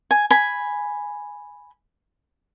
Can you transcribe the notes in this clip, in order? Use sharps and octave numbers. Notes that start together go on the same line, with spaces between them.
G#5
G#5 B5